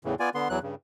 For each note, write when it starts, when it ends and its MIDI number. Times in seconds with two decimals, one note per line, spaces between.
0.05 0.15 40
0.05 0.15 45
0.05 0.15 49
0.05 0.15 52
0.20 0.30 59
0.20 0.30 65
0.20 0.30 74
0.20 0.30 80
0.35 0.48 50
0.35 0.48 59
0.35 0.48 84
0.50 0.59 40
0.50 0.59 52
0.50 0.59 54
0.50 0.59 90
0.62 0.75 43
0.62 0.75 49